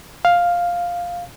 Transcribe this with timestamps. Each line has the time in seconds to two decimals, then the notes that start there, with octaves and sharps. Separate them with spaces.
0.25 F5